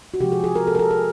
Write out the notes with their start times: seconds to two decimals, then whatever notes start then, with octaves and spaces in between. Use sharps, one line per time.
0.14 F#4
0.20 C3 F3 G#3 G4
0.32 G#4
0.44 G#4
0.55 A#4
0.67 A4
0.75 A#4
0.79 A4
0.91 G#4